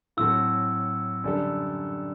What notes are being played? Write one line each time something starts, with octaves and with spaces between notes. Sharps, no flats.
A2 F#3 C4 F#4 A4 E6
F#2 D3 G3 D4 A4